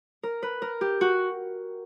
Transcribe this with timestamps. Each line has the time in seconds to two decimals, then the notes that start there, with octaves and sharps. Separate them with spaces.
0.23 A#4
0.43 B4
0.62 A#4
0.81 G4
1.01 F#4